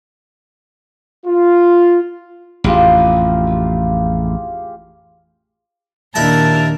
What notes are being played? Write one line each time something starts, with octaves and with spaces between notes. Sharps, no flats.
F4
A1 F2 F4 G4 G#4
D#2 A#2 D4 E4 A#4 A5 A#5